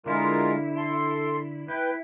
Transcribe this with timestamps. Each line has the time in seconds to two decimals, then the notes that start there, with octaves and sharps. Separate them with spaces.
0.06 D3 G#3 E4 F4 A#4
0.77 A4 C6
1.68 E4 B4 G5